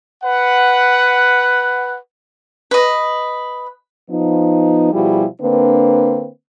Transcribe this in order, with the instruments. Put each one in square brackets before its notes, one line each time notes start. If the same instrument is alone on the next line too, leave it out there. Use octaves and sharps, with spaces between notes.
[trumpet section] B4 F#5
[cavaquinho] B4 D#5
[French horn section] F3 B3 D#4
B2 F3 G3 E4 F#4 G#4
D3 A#3 C4 D4 B4